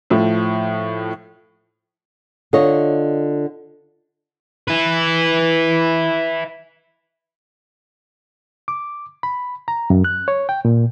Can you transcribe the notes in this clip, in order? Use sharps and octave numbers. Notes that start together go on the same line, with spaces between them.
A2 F3
D3 F4 C#5 D#5
E4 B4
D6
B5
A#5
F#2
F#6
C#5
G5
A#2